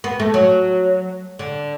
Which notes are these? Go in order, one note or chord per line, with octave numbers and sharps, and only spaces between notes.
B3
A3
F#3
D3